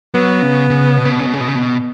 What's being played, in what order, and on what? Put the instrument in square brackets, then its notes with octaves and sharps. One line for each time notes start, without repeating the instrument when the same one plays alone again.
[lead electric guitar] F#3 [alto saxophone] B3
[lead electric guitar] C#3
C#3
B2
C#3
B2
C#3
B2
C#3
B2
C#3
B2